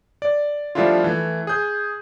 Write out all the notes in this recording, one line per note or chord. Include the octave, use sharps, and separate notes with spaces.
D5
F3 G3 A3 D4 E4 F4
E3 A3
G#4 G6